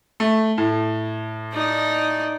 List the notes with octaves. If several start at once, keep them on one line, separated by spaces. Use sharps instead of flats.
A3
A2
D#4 D5